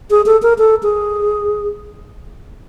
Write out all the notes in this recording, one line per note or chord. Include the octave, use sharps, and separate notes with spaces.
G#4
A4
A#4
A4
G#4